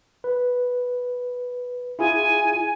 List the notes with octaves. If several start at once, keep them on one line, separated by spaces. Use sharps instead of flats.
B4
E4 F4 G#4 G#5